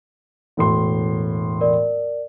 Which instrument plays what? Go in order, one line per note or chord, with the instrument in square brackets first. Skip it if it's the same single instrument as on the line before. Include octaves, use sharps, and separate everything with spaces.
[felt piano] E1 A2 C6
[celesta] A#4 D5